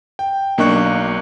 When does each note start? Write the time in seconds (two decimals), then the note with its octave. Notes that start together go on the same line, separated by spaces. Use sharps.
0.19 G5
0.58 B1 A#3 D4 D#5 C#6 F#6